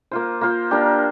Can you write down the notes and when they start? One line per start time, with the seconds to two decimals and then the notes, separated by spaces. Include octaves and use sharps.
0.11 A#3 F4 C5
0.41 A#3 F4 C5
0.71 A#3 D4 G4